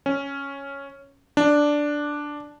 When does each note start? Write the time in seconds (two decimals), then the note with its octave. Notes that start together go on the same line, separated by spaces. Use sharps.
0.06 C#4
1.37 D4